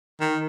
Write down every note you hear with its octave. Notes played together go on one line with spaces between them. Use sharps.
D#3